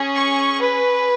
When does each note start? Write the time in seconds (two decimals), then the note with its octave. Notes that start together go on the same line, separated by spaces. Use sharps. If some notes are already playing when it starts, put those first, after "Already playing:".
Already playing: C#4 G#4
0.17 C#6
0.62 B4